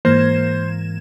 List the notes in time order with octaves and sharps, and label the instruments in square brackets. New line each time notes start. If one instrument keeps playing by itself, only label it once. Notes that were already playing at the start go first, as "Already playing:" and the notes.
[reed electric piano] G#2 E3 [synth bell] A#3 G#6 E7 [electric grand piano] C5